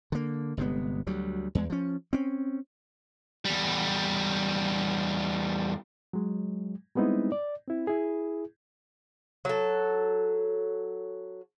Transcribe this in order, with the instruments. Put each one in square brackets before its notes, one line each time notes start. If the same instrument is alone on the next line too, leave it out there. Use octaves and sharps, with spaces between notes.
[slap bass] D3 A#3
G1 C3 G#3 B3
D2 F#3 G3
E2 G#3
F3 C#4
C4 C#4
[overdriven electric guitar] E2 G3
[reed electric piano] F#3 G#3
G3 G#3 B3 C4 D#4 E4
D5
C4 E4
E4 G#4
[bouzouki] F#3 A4